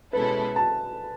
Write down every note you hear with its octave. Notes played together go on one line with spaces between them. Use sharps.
B2 G#3 C#4 E4 A4 B4
A5